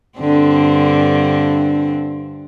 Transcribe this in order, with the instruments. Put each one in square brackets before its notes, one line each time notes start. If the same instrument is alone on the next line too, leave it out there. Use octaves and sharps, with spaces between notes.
[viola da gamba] G2 D3 C4